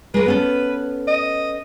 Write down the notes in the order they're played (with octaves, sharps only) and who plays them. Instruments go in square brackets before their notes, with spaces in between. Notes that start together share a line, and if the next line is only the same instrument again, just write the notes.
[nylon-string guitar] G#3 A#4 [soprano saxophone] B4
[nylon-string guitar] B3 C#4 A4
[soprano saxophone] D#5